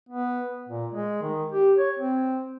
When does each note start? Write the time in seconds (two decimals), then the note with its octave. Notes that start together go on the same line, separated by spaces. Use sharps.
0.09 B3
0.69 A#2
0.92 G#3
1.22 D#3
1.52 G4
1.78 C#5
1.99 C4